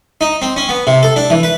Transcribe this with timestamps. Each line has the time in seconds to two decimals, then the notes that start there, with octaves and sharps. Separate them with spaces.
0.21 D#4
0.42 C4
0.56 C#4
0.69 B3
0.87 C3
1.03 A4
1.16 D4
1.30 E3
1.43 B4